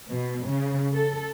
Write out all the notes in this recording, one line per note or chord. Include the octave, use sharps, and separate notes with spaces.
B2
C#3
A4